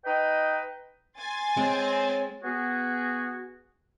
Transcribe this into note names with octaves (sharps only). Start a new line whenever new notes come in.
D#4 B4 D#5 G5
G#5 C6 A6
G#3 C4 C#5
B3 F#4 G#4